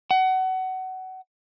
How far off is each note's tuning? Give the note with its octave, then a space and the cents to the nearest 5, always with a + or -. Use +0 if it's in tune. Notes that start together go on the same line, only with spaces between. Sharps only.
F#5 +25